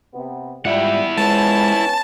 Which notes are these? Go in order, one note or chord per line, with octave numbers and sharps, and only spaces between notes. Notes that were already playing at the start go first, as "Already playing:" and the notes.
C3 B3
G#2 G3 E4 F4 E5 F#5
F2 G#3 B3 C#4 A5